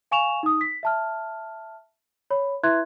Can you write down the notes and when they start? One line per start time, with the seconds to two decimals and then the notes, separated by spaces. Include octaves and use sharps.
0.11 F5 G#5 C#6 E7 F7
0.43 D#4 D#6
0.61 B6
0.83 E5 A5 F6
2.30 C#5 B5
2.63 E4 B4 E5 C6 F#6 G#6